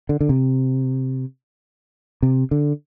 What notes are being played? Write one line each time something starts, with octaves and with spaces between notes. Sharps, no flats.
D3
D3
C3
C3
D3